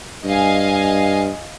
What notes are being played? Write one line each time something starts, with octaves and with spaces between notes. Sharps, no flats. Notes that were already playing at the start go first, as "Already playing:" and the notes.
G2 D#5 F5 G#5